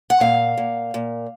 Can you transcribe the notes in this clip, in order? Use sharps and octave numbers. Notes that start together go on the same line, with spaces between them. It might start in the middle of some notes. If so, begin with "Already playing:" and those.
F#5
A#2 F5
A#2
A#2